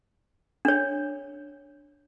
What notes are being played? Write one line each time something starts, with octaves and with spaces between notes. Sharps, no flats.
D4 C#5